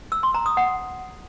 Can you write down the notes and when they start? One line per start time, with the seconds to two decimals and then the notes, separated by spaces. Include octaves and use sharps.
0.12 E6
0.23 C6
0.34 A#5
0.46 D#6
0.57 F#5